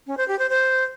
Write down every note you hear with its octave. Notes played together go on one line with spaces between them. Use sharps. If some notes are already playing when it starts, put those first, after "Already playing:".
C#4
C5
G4
C5
C5